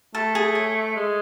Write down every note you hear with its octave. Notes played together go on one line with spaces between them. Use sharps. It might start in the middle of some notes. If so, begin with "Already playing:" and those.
A3 A4
G#4
C#5
G#3